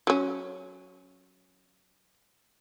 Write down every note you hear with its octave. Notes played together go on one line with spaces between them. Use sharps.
F#3 C#4